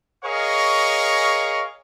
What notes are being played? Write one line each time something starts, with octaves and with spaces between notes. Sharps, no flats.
G#4 A#4 C#5 D#5 F5 C#6